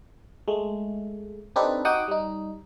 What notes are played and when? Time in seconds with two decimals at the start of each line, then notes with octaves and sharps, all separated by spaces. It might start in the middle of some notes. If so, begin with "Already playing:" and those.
0.48 G#3 A3
1.56 C4 D4 D#4 G4 A4 B4
1.85 D#4 F#4 F#5 G5 D6 D#6
2.08 G3 D#4